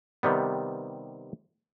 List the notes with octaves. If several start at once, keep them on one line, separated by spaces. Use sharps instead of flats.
C3 D#3 G3 B3